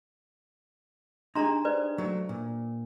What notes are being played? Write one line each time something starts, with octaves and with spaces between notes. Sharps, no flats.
D4 D#4 G4 G#4 A#5 C6
B4 C5 D5
F#3 A3
A#2